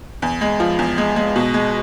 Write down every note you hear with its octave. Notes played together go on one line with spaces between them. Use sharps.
E2
G#3
F3
E2
G#3
G#3
B2
G#3